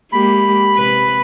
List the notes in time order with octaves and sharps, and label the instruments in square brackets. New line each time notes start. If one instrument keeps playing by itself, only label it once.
[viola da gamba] G#3 A#3 G4 [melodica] B5
[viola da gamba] C3 B4